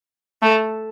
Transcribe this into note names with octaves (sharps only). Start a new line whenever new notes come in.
A3